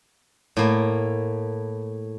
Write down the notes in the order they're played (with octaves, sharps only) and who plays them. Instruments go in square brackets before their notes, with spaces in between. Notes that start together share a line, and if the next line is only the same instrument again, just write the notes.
[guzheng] A2 A#3